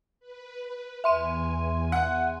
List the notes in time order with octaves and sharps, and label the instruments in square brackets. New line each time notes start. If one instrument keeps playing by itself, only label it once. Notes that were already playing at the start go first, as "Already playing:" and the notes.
[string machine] B4
[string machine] E2 G#5 [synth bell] E5 C6 D#7
[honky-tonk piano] F#5